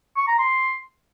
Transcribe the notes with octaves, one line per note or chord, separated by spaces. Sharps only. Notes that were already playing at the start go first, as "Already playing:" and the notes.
C#6
A#5
C6